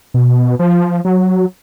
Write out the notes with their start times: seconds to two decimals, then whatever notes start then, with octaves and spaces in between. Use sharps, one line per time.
0.14 B2
0.59 F3
1.05 F#3